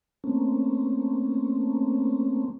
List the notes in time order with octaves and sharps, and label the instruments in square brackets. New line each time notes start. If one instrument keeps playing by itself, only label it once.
[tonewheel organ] A3 A#3 C4 C#4